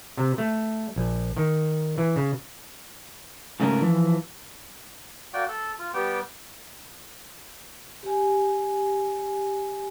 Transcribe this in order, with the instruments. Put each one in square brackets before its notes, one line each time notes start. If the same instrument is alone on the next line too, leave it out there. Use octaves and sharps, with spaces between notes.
[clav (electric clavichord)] C3
A3
A#1
D#3
E3
C#3
[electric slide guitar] G#2 C#3 A3 C#4 A#4
E3 F3
[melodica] A#3 F#4 D5 G5
A4
F4
G3 B3 G4 G5
[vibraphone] G4 G#5